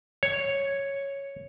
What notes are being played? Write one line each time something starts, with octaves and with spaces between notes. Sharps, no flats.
C#5